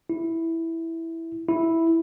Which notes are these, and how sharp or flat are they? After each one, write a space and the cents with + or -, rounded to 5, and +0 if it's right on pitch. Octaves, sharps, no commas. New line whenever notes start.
E4 -5
E4 -5